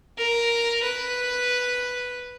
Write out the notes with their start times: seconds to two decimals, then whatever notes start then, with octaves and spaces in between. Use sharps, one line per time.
0.18 A#4
0.83 B4